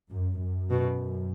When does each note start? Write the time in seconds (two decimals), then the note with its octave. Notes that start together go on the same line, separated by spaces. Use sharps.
0.12 F#2
0.41 F#2
0.70 B2